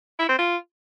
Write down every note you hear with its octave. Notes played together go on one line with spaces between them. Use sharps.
E4
C4
F4